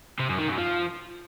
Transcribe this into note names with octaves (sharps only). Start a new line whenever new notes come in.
C3
F#2
D#3
F#2
F3